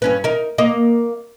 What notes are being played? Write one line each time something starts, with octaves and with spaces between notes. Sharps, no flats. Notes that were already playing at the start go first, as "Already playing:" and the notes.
G2 C#4 B4
D#4 A#4
A#3 D#5